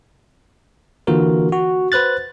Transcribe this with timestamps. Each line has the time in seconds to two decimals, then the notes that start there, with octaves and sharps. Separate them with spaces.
1.07 D3 E3 A#3 F4 F#4 A#4
1.52 F#4
1.92 B4 C5 F#6 A6